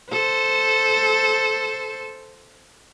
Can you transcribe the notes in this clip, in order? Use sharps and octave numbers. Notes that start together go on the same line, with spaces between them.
A4 C5